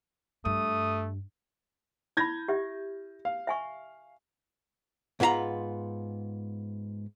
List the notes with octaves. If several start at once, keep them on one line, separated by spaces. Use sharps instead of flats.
G2 A3 D#6
E4 B5 G6 G#6 A#6
G4 E5
F5
E5 G#5 C#6
G#2 B3 F4 G4 A#5 B5